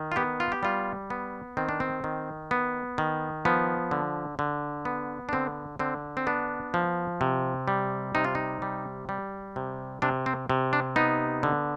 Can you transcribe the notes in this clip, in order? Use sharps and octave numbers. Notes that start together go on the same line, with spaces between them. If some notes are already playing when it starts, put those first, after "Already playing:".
Already playing: D#3
F4
B3 G4
F4
G4
G3 F4
B3
D#3 C4
D4
C4
D#3
B3
D#3
F3 B3
D3
D3
B3
D4
D3 C4
D3 C4
C4
B3 D4
F3
C3
G3
C3 D#4
F4
D#4
G3
G3
C3
C3 D4
C4
C3
D4
B3 D#4
D3